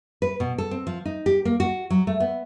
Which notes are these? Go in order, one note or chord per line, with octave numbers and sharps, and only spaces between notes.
B4
B2
A4
C4
F3
D#4
G4
A#3
F#4
F#3
A3
B3